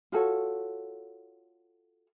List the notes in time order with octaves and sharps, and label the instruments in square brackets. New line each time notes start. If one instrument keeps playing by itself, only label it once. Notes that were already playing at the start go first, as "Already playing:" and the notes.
[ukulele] F4 F#4 A4 C#5